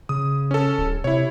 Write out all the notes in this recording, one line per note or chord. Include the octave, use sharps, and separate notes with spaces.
C#3 D#6
C#4 A4
D1
C3 E4 C#5